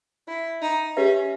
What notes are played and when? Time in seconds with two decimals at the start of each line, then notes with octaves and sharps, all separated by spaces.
0.27 E4
0.62 D#4
0.96 C#4 G4 B4 E5